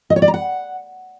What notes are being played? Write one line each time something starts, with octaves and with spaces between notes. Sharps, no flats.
D#5
C#5
D5
A#5
F#5